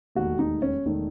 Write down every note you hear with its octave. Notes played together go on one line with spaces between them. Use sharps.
E1 D#2 D#3 A3 F#4
D#4
C#4
E1 D#3 A3